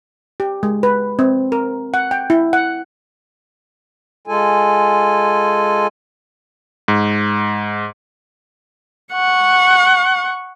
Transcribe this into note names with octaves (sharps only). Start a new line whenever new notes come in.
G4
G#3
B4
C4
A#4
F#5
G5
E4
F#5
G#3 F4 A4 G#5
G#2
F#5 C#6